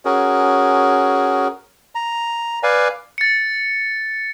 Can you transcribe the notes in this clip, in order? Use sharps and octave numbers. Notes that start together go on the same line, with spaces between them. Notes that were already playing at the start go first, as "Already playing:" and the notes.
C#4 F#4 G#4 A#4
A#5
B4 D5 F5 G#5
A6 C#7